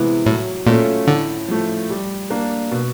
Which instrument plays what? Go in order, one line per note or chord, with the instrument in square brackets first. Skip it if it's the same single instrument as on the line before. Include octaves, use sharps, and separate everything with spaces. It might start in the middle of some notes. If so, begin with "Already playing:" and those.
Already playing: [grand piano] C3 E3 G#3 B3 E4
[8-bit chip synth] A2 [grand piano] F#3
[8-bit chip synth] A#2 [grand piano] A3 C#4 F4 A4
[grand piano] A2 [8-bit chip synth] D3
[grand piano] F3 A3
G3
A#3 D4
B2